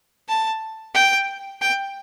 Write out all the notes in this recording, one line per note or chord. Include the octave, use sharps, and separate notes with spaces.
A5
G5
G5